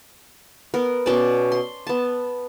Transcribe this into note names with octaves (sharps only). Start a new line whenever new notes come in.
B3 A#4
B2 C#4 D5 A5
C6
B3 A5